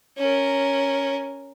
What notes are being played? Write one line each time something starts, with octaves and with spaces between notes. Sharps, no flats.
C#4 A#4